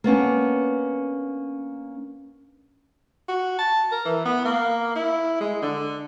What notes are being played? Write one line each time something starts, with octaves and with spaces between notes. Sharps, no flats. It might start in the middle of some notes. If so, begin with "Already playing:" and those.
A#3 B3 C#4 D4
F#4
A5
A#4
E3
B3
A#3
E4
G#3
D3